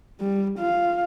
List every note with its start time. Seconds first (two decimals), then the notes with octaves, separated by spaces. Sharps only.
0.20 G3
0.59 F4 F5